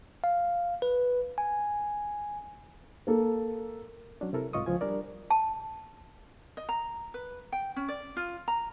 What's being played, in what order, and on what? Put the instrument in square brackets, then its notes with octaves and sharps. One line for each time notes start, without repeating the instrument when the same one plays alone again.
[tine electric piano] F5
B4
G#5
[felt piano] A#3 A4
[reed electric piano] F#3 C#4 D4
C3 E4 A4 A#4
C2 G#2 F4 D#5 C#6 D#6
C#2 F3 F4 G#5
G3 D4 A#4 D5
[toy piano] A5
[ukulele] D#5
A#5
B4
G5
C#4
D5
F4
A#5